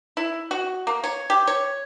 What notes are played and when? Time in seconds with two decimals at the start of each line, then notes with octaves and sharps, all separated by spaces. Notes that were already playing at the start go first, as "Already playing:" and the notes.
0.17 E4
0.51 F#4
0.87 A#3
1.04 C#5
1.30 G4
1.47 C#5